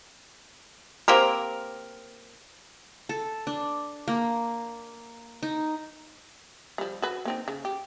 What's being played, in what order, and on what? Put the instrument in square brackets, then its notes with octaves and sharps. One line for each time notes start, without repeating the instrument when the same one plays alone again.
[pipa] A#3 C4 G4 A#4
[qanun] A4
D4
A#3
D#4
[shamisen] F3 G3
F#4 B4
A#3 C4 D#4
C#3
G4